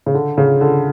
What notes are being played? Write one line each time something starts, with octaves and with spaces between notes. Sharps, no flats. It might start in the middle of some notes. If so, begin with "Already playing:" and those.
C#3
D3
C#3
D3